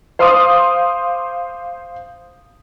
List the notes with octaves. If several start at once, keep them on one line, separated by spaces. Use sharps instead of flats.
C5 F5 C6 D6 D#6